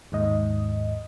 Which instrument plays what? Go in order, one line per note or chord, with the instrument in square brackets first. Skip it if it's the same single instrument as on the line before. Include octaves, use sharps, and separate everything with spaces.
[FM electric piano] D#2 G#2 D#5